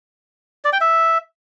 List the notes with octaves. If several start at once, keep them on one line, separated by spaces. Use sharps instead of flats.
D5
G5
E5